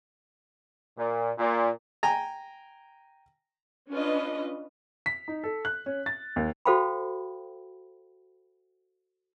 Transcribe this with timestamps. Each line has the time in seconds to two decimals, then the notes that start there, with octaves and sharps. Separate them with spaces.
0.97 A#2
1.38 A#2
2.03 G5 G#5 A#5
3.91 C#4 D4 F4 B4 D#5
5.06 B6
5.28 D#4
5.44 A4
5.65 F#6
5.86 C#4
6.06 A6
6.36 D#2
6.65 F#4 A4 C5 F5 G5 B5